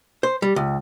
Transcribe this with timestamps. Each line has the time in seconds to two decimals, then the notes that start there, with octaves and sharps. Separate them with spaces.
0.23 C5
0.42 G3
0.56 C#2